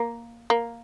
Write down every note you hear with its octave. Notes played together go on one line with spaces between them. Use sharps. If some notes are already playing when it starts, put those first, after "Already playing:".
Already playing: A#3
A#3